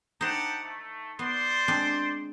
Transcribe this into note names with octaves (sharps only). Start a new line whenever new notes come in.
D#4 G4 C5 F#5 A5
A3
B3 C5 D5 C6
G#3 C4 D4